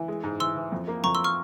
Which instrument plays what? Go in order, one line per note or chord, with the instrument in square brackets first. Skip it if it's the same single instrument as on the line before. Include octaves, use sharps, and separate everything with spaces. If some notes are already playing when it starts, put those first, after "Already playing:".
Already playing: [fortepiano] E3
G#3
G#2
[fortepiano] E3 [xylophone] C6 E6
[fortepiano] E3
F2
A#3
[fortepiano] F2 [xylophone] A#5 C#6
[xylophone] C6 E6
C#6 F6